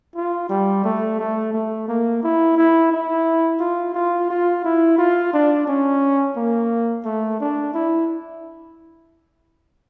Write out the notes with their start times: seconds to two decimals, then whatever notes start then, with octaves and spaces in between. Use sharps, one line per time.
0.16 F4
0.49 G3
0.84 A3
1.19 A3
1.53 A3
1.88 A#3
2.23 E4
2.57 E4
2.92 E4
3.60 F4
3.94 F4
4.30 F4
4.64 E4
4.98 F4
5.33 D4
5.67 C#4
6.37 A#3
7.05 A3
7.40 D4
7.74 E4